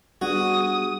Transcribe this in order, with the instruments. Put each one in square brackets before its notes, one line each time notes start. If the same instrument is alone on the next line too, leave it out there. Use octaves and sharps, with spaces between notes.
[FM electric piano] G3 B3 D4 [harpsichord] F#4 [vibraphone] G#4 [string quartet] D#6